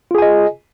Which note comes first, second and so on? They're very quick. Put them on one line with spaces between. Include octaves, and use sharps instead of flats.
F4 G#4 G#5 D#5